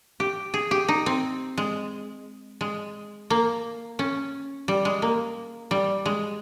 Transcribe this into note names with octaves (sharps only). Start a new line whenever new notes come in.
G4
G#4
G4
D#4
C4
G#3
G#3
A#3
C#4
G3
G#3
A#3
G3
G#3